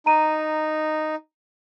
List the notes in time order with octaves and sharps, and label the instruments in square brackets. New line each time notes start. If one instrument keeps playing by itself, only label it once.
[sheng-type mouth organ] D#4 [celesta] A#5 D#7